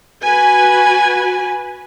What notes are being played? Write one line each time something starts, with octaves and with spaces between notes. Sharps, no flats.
F#4 B4 G#5